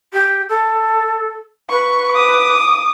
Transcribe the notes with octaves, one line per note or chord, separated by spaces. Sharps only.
G4
A4
B4 C#6
D6 D#6